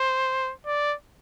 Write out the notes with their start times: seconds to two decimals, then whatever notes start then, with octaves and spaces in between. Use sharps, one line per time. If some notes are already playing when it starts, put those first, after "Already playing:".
Already playing: C5
0.66 D5